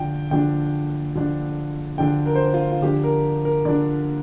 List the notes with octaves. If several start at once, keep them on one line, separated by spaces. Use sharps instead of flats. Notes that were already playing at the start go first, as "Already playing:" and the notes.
Already playing: D3 F3 D4 G5
D3 F3 D4 G5
D3 F3 D4
D3 F3 D4 G5
A#4
C5
A#4
F4
F4
D3 F3 D4 G4
A#4
A#4
D3 F3 D4 D5